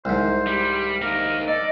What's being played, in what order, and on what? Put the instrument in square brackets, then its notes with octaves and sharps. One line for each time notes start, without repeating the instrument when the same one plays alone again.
[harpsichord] C2 G#2 [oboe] C5
[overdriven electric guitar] G3
[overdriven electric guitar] A#3 D#4 [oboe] A#4
[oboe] A4 [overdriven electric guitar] D5 [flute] D#5